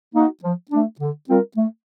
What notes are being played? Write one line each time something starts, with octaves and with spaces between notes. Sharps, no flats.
A#3 D#4 F#4
F3
A3 D4
D3
G3 C4 F4 A#4
A3